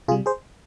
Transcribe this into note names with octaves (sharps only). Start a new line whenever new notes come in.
C3 G3 F4 G#4
G#4 C5